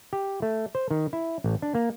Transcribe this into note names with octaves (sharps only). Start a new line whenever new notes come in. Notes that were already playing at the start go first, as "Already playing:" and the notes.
G4
A3
C5
D#3
E4
A1
D4
A#3